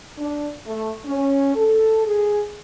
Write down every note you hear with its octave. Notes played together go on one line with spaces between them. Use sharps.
D4
A3
C#4
A4
G#4